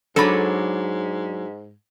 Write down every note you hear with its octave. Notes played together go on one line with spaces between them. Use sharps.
G#2 F#3 D4 A4 C#5 B5